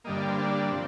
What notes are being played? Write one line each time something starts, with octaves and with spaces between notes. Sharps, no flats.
G2 D3 G3 A#3 D#5
D5
C5
D4
C3 F3 C4